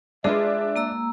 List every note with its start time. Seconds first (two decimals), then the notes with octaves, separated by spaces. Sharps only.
0.24 G#3 D4 F4 G#4 B4 E5
0.76 A#3 A#5 E6